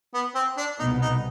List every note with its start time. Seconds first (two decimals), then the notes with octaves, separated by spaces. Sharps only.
0.14 B3
0.35 C4
0.57 D4
0.79 C2 B2 B3 D#4
1.02 D#4